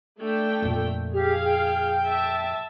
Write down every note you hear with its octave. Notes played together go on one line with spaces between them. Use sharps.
A3 D4 G5
F2 A#2
G4 G#4 F5
G5
E5 A5